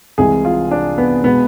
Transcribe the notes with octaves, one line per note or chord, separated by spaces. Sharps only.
C2 C3 E3 G#3 G#4
F4
D4
B3
B2 G#3 B3